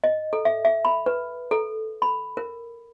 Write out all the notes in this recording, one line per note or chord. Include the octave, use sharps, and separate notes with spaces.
D#5
A4
E5
E5
B5
B4
A4
B5
A#4